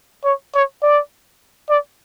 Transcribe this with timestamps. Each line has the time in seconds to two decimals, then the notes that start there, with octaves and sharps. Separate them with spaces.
0.24 C#5
0.54 C#5
0.82 D5
1.70 D5